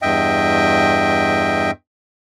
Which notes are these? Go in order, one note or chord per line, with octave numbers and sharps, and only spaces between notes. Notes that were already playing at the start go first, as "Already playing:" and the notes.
E2 G2 D#5 E5 G5